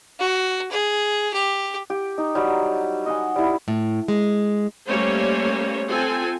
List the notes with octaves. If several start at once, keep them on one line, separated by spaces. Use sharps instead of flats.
F#4
G#4
G4
G4
D#4
F#3 G3
D#5 F#5 G#5
G3 E4
A2
G#3
G3 A3 A#3 C#4 C5 C#5
C4 F4 A4 G#5